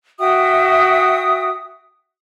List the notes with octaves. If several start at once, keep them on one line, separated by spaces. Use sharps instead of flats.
F#4 E5 G5 D#6